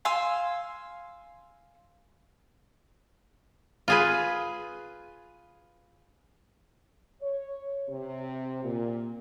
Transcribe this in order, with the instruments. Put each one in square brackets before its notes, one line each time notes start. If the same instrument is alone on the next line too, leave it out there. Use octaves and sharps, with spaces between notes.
[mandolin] F5 G#5 C6 E6
[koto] F4 G#4 B4
[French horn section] C#5
C3
A#2